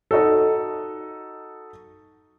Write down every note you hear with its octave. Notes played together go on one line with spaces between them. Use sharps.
D#4 F#4 A4